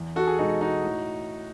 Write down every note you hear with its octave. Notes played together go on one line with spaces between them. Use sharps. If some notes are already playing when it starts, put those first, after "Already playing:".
Already playing: E2
F#4 A4
G#4
B2 G#3 D#4 F#4
D#4 F#4
A2